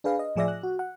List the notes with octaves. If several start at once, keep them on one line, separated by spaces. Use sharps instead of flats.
D4 G#4 B4 F5
D#5
A2 F3 G#4 D5 E5 A#6
F#6
F#4
F#5